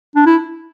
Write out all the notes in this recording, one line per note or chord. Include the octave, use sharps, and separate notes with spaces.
D4
E4